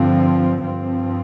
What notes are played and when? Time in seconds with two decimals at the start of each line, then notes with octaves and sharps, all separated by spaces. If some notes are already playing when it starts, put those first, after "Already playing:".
Already playing: G2 D3 F3 C4
0.64 G2 F3 C4